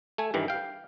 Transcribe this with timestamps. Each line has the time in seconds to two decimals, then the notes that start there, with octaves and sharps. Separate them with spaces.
0.18 A3 G#5
0.34 G2 D#3 E3 G3
0.48 F5 G5